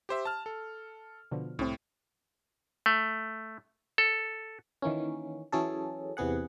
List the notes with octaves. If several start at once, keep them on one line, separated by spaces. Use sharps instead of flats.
G4 C5 E5
A5 F6
A4
B2 D3 F3
C2 A2 C4
A3
A4
D#3 E3 A#3 C#4
E3 F#3 C#4 G#4 A4
E2 C3 B3 G#4 F#5